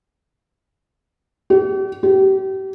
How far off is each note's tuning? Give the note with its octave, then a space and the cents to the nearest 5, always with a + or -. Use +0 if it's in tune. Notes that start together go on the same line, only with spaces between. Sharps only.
G4 -45
G4 -35